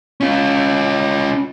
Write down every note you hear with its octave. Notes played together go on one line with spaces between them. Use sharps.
C#4 F4